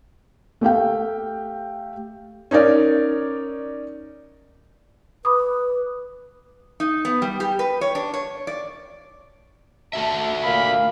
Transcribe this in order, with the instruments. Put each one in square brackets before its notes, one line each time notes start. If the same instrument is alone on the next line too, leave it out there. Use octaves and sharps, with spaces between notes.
[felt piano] A3 G4 F5 G5
C#4 D#4 A#4 D5
[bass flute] B4 [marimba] B5 D6 D#6
[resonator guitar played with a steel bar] D#4
B3
G3
G4
B4
C#5
D4
C#5
D5
[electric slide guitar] A3 F#4 E5 [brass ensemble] A5
[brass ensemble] A#2 [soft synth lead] F5 [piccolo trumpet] B5